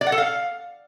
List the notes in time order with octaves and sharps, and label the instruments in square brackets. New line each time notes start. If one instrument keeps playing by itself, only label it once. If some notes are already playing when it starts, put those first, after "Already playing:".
[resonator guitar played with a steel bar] D5
F#5
A4
F5